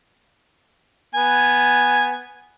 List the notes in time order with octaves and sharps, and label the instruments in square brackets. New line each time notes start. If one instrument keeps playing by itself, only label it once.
[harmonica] B3 G#5